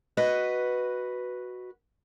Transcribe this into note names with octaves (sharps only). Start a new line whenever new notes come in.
F#4 B4 D#5